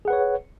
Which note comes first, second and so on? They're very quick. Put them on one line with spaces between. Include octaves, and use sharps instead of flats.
G#4 F#5 B4 C#5